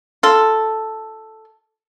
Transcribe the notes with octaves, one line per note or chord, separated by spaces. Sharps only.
F4 A4